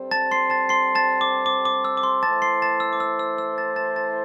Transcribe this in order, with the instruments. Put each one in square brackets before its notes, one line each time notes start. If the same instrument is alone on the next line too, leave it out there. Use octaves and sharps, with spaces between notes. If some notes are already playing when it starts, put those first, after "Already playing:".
Already playing: [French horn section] G2 G3 C4 A4 C5
[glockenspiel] A5 A6
C6 C7
A5 A6
C6 C7
A5 A6
D6
D6
D6
E6
D6
C6
[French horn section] E3 A3 E4 C5 [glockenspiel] A5 A6
[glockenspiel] C6 C7
A5 A6
E6
D6
E6
E6
E6
A5 A6
A5 A6
A5 A6